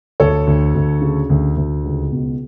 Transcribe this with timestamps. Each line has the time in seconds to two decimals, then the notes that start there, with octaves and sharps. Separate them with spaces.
0.20 D2 A4 C#5
0.47 D2
0.75 D2
1.01 C#3
1.29 D2
1.56 D2
1.84 C#2
2.11 B2